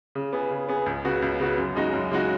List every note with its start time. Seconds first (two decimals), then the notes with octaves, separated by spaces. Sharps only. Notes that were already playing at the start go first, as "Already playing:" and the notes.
0.15 C#3
0.33 B3 G#4
0.51 C#3
0.69 B3 G#4
0.86 C#2
1.05 C#3 B3 F#4
1.22 C#2
1.40 C#3 B3 F#4
1.58 F#2
1.75 C#3 G#3 D#4 F#4
1.93 F#2
2.11 C#3 G#3 D#4 F#4